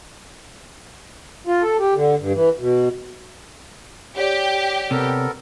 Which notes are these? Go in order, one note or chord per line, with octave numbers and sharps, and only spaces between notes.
F4
A4
G4
D3
G2
E3
B2
G4 C#5 D5
C3 B3 A4 A#4